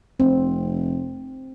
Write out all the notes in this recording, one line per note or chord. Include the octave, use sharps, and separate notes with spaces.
F1 C4